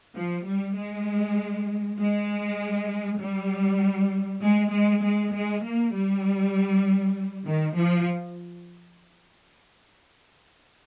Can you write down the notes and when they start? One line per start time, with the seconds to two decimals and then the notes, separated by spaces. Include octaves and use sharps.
0.15 F3
0.45 G3
0.75 G#3
1.98 G#3
3.19 G3
4.42 G#3
4.72 G#3
5.01 G#3
5.32 G#3
5.64 A#3
5.93 G3
7.45 D#3
7.76 F3